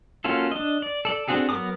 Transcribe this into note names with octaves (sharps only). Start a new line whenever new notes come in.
A#3 C#4 F4 F#4 A4
D4 D#5
D5
A4 D5
C4 D4 F#4 G#4 A4
F#3 B3 A#4 D6 D#6